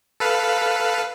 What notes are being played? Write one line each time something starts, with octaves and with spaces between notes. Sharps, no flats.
A4 B4 F5